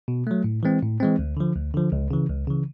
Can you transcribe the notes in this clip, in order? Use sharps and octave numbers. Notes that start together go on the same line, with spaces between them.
B2
F#3 A3
A2
E3 G#3 C4
A2
E3 G#3 C4
D2
D3 F3
D2
D3 F3
C#2
C#3 E3
C#2
C#3 E3